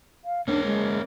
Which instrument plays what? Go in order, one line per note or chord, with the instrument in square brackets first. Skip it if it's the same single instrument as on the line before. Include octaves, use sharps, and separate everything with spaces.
[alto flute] F5
[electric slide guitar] A#3 C#4 [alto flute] D4
[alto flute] G#3